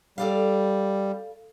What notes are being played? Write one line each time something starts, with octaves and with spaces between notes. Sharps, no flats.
G3 A4 D5 F5